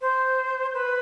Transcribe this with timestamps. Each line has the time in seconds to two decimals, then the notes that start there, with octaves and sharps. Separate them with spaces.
0.01 C5
0.73 B4